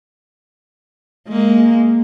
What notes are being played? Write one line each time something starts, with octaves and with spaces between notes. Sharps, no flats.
G#3 A#3